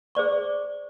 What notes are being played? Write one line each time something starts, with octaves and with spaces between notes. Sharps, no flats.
G#4 C5 D5 C#6